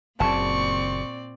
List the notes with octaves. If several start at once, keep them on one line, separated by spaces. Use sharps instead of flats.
F#1 A#2 C#3 C4 D5 A5 C#6